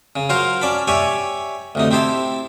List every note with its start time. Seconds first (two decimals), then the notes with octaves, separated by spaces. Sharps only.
0.16 C#3
0.29 F#3 F4 A#4 C5 F5
0.61 C#4 D5 A5 B5
0.87 G4 C#5 D5 E5 G#5 C#6
1.75 D2 C3 D#4
1.91 C4 E4 G4 C5 A5